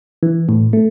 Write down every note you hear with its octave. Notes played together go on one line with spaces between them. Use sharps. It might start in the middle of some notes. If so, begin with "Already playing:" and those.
E3
A2
A3